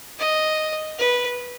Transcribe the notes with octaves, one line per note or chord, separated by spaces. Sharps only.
D#5
B4